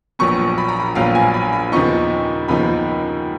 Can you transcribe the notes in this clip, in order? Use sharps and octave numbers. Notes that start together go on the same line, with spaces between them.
A#1 A#2 F#3 B3 C#6
B5
A#5
B5
A#1 A#2 F#3 B3 F5
G#5
B5
B5
D#2 C#3 F3 B3 D#4 C#6
D#2 C#3 F3 B3 D#4 B5